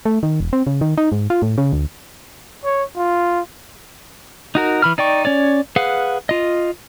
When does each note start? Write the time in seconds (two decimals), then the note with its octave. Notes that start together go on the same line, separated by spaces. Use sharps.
0.05 A3
0.23 D#3
0.40 E1
0.53 C4
0.67 C#3
0.81 D#3
0.98 D#4
1.12 G#2
1.30 F4
1.42 A2
1.58 C#3
1.73 D2
2.64 C#5
2.96 F4
4.55 D#4 F#4 A#4
4.82 E3 B5 F6
4.98 D#4 D5 G5 C#6
5.25 C#4 C#5 D5
5.76 G#4 B4 F5 F#5
6.29 F4 D#5